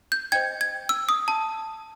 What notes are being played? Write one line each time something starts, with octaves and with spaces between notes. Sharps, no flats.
G6
C5 D#5 G5 G#6
G#6
E6
D#6
A5